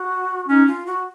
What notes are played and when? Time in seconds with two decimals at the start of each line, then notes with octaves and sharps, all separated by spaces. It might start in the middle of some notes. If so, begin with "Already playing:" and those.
Already playing: F#4
0.48 C#4 D#4
0.67 F4
0.86 F#4